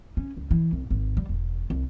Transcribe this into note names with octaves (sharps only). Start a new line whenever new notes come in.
C#4
C#2
E3
C2
G#1
G3
E1
C2